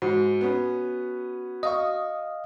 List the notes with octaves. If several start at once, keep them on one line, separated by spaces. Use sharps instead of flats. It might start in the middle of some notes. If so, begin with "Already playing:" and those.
G#2 F#4
B3 C#4
D#5 F5 C#6 D#6